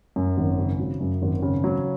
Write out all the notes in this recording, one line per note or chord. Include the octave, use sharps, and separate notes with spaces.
F#2
G#1
C#3
F#3
F#2
G#1
C#3
F#3